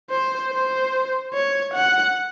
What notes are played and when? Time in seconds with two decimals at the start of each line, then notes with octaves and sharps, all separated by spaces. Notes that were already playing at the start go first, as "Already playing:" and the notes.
0.10 C5
0.51 C5
1.34 C#5
1.74 F#5